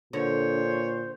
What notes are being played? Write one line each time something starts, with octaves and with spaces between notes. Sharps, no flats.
A#2 D3 C5 C#5